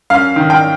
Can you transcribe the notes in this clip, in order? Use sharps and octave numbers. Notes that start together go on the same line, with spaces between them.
F#2 F5
D#3
G5